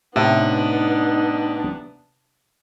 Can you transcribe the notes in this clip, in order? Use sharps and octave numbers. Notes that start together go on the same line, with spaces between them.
A2 C3 B3 D4 D#4 E5